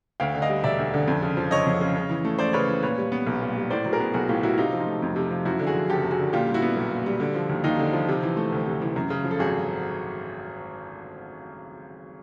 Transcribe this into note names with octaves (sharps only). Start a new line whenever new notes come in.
D2 F5 G5
D3
D#5 F5
G3
E1 D5 E5
D2
D3
F2
C#3
F3
F#1 C#5 D#5
F2
C#3
C#3
E3
A3
C#2 C5 D5
C#3 B4 C#5
E3
A#2 B4 C#5
G3
B3
B1
A#2
G3
A2 C5 D5
F#3
G#4 A#4
B3
B1 F#4 G#4
A2 F4 G4
F#3 E4 F#4
C3 D#4 F4
F3
D#4 F4
A3
F2
C3
F3
F#2 E4 F#4
D3
F#4 G#4
F3
F#1 G4 A4
F#2
F#4 G#4
D3
A#2 F4 G4
G3
E4 F#4
B3
B1
A#2
G3
D3
F3
D#2
D#2 D#4 F4
D3
F3
C3
E3
A3
D2
C3
E3
F#2
C#3
F3
A4
G#1 F#4 G#4